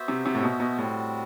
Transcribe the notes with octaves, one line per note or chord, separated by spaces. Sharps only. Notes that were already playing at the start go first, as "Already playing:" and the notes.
Already playing: B3 F#4 C5 E5
C3
C3
A2
B2
B2
A2 G3 C4 F#4